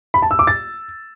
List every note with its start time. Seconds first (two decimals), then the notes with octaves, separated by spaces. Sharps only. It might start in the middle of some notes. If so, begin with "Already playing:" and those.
0.14 B5
0.22 A5
0.31 E6
0.39 D6
0.47 A6